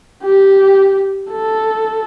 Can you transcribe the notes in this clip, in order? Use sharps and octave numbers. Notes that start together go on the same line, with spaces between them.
G4
A4